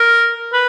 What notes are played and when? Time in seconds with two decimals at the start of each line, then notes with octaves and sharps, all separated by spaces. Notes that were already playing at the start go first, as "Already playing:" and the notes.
Already playing: A#4
0.53 B4